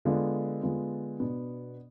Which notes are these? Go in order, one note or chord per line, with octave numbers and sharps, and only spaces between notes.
D3 G#3 B3 F4
D3 G#3 B3 F4
B2 B3 D4